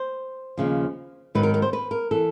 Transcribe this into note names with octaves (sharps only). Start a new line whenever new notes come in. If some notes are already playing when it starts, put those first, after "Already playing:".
Already playing: C5
D#2 C#3 F3
G#2 D#3 F#3 B4
A#4
A#4
C5
B4
A#4
E3 A4